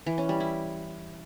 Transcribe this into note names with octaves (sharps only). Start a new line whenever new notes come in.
E3
C#4
G3
E4